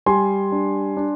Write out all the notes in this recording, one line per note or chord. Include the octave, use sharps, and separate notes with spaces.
G3 G#5 C6
D4
D4